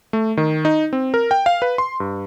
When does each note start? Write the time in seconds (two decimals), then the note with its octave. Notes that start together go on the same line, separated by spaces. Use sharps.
0.13 A3
0.37 D#3
0.65 D#4
0.93 C4
1.14 A#4
1.31 G5
1.46 F5
1.62 B4
1.78 C6
2.00 G2